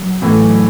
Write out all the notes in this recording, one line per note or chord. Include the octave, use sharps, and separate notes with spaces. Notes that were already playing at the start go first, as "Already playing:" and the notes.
Already playing: F#3
A2 E3 A3